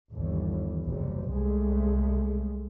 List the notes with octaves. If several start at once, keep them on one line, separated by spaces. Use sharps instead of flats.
G1 D#2 E3
F#1 C2 C3
C2 C3 G#3 A3